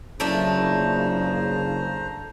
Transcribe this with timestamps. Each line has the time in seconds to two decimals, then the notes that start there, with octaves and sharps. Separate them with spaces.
0.20 F#1 C#3 F3 A3 D4 C5 A#5